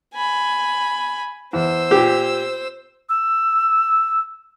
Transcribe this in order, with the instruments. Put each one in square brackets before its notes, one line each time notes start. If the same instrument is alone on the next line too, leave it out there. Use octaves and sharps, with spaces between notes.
[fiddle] G#5 B5
[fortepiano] E2 [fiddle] C5 E6
[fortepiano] A#2 G4
[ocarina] E6